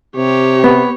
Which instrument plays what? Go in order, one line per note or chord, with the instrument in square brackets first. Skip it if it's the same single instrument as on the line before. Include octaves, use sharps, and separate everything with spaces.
[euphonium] C3 [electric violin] G4 C#5
[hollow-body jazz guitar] B3